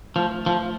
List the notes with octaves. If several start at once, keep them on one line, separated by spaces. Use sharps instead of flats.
F3 A3
F3